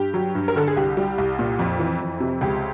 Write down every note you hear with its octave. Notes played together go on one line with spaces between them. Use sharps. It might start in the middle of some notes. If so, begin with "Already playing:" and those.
Already playing: G2 G4
F#3
G2
A#4
D3 A4
G#4
C2 G4
G3
C2
A#2
F2
E3
F2
C3
C#2 G4